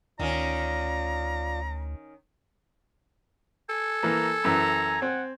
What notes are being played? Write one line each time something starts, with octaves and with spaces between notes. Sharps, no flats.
D2 D#3 C#4 F4 D5 A#5
A4 G#5
E3 A#3 A#5
F#2 E3 A#5
C4 F#5